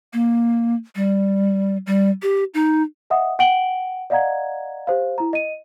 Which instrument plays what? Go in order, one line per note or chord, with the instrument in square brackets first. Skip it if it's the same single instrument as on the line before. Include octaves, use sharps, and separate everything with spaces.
[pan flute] A#3
G3
G3
G4
D#4
[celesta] D#5 E5 F#5 D#6
F#5 G5 D7 F#7 G7
D5 D#5 F5 F#5 A#5 G#6
G4 C5 F5
E4 A#5
D#5 D#7